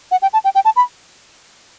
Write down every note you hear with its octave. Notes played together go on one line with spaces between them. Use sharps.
F#5
G5
A5
G5
G5
A5
B5